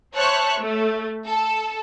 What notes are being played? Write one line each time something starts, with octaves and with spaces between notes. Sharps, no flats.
C5 C#5 E5 A5 C#6 F#6
A3
A4